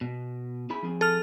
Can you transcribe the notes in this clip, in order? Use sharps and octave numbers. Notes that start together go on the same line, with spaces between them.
B2
E4 G#4 B5
F3 C4 G#4
A4 F6